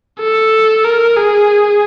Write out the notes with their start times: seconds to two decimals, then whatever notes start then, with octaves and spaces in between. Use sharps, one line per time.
0.21 A4
0.84 A#4
1.16 G#4